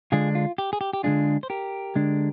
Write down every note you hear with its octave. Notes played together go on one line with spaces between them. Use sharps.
D3 G#3 D4 F4 G#4
F4
G4
G#4
G4
G4
D3 G#3 D4 F4 G#4
C5
G4 A#4
D3 G#3 D4